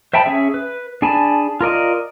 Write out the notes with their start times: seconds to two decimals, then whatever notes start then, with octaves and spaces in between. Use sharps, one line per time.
0.13 C5 E5 G5 A5 B5
0.26 C#4 G#4 E5
0.54 B4
1.02 D4 G#4 G#5 A5 B5
1.61 F4 A#4 D5 D#5